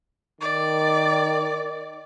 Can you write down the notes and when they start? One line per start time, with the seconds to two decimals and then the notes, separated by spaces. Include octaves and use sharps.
0.41 D#3 D5